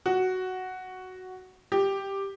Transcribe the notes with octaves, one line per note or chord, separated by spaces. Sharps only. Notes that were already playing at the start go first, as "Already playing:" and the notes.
F#4
G4